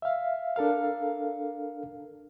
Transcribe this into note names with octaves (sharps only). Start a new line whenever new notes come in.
E5 F5
D4 A4 A#4 F5